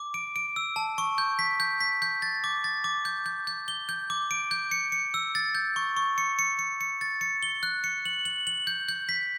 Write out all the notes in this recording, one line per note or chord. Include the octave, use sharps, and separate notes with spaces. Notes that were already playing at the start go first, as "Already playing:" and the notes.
Already playing: D6
D7
D7
E6
A5
C#6
G6
B6
G6
B6
G6
A6
D6
A6
D6
G6
G6
G6
G7
G6
D6
D7
G6
C#7
C#7
E6
A6
G6
C#6
C#6
C#7
C#7
C#7
C#7
A6
C#7
G7
F#6
C#7
F#7
F#7
F#7
G6
G6
B6